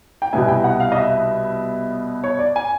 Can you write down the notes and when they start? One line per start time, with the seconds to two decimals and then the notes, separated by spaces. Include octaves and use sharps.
0.22 G5
0.33 C2 B2 G3 B3 E4 G#5
0.48 G5
0.64 F#5
0.80 F5
0.92 D#5
0.96 E5
2.24 C#5
2.39 D5
2.56 G#5